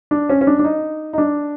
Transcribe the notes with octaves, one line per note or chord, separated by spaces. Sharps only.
D4
C#4
C#4
D4
D4
D#4
D#4
D4